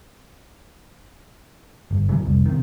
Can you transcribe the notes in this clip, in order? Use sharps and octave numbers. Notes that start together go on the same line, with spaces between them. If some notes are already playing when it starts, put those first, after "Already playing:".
G1
C#3 E3 F#3
F1 C2
C3 D#3